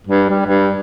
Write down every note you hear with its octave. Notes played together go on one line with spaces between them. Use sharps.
G2
G3
G2